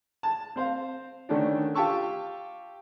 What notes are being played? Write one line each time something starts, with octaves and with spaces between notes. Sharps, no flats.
A5
C4 C5 F5
D3 D#3 A3 C#4 D4
F4 G4 G5 A5 C#6 E6